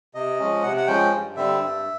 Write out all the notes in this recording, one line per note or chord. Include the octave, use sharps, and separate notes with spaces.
C3 D#5
F3 G#3 C#4
C3 F#5
F#5
F3 G#3 C#4 G5
G2
D3 G3 C4 E5
G2